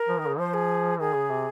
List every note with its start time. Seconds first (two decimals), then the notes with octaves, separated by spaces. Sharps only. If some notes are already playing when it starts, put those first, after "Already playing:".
Already playing: A#4
0.08 F3
0.19 D#3
0.28 C#3
0.39 F3 C5
0.54 G#4
1.00 D#3 G#4
1.14 C#3
1.30 C3